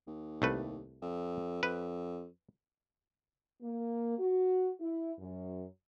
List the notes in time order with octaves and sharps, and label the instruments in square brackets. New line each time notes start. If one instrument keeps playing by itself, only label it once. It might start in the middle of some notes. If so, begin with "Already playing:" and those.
[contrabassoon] D#2
[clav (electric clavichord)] C2 A3 B4
[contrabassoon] F2
[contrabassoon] F2 [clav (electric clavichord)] B4
[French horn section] A#3
F#4
E4
F#2